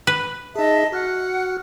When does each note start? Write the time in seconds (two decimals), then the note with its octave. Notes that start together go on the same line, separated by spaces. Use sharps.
0.07 B4
0.56 D#4 G#4 D#5 E5 A5
0.92 F#4 F#5 F6 F#6